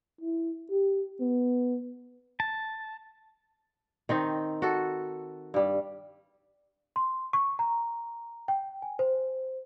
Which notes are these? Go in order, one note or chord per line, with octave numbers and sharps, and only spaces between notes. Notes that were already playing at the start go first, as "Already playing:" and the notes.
E4
G4
B3
A5
D#3 C4 D#4
F#4 A4
G2 G3
C6
C#6
A#5
G5
G#5
C5